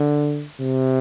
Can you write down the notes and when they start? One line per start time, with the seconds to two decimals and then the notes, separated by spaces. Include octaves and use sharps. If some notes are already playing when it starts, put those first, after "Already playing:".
Already playing: D3
0.61 C3